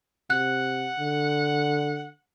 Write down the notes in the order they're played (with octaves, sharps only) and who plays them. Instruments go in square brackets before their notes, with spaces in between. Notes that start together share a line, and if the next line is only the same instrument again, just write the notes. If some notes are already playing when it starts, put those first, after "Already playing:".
[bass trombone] C3 [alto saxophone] F#5 [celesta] F#6
[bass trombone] D3